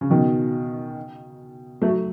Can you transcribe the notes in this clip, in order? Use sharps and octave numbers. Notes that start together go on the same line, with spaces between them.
C#3
B2 D#3
F#3 A3